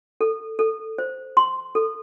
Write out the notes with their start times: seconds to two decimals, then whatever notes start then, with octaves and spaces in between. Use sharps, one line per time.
0.21 A4
0.59 A4
0.98 C5
1.37 C6
1.75 A4